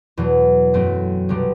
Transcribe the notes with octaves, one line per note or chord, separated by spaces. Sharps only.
E2 B2 F#3
F#2 F#3 A3 C4
C2 B2 G3 C4